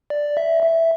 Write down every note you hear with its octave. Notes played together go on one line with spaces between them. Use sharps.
D5
E5
E5